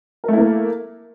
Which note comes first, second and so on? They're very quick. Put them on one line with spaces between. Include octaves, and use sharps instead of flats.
A#4 A3 E4 A#3